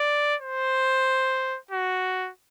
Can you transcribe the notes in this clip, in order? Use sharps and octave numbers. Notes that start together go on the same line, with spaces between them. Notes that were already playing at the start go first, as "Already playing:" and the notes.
Already playing: D5
C5
F#4